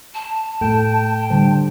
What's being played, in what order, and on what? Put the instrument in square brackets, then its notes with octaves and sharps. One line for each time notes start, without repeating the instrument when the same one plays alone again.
[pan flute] A5
[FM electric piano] A2 [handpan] A4 [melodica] G5
[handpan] D3 G3 C5